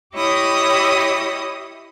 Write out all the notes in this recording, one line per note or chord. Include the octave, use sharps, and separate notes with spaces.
E4 G4 C#5 D#5 B5 D#6